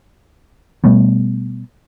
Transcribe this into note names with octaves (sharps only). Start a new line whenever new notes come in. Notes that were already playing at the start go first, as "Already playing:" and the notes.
B2 G3 A3 B3